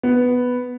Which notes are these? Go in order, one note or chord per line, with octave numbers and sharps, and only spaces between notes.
B3